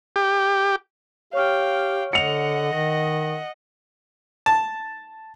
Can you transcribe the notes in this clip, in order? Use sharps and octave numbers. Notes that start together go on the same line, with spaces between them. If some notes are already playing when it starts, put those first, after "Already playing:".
G4
G4 C#5 F5 G5 C#6 F6
D3 D#5 F#5 C#7 F7
D#3 A#6
A5